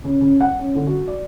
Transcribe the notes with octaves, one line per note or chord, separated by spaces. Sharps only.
C#3
C#3
F#5
C#4
D3
F#4
D5